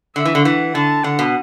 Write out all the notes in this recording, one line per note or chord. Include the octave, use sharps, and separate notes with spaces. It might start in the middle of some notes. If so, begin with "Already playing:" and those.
D3 E5
E3
D3
E3 F#5
D3 A5
D3 F#5
B2